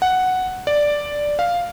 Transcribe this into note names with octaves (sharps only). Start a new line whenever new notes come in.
F#5
D5
F5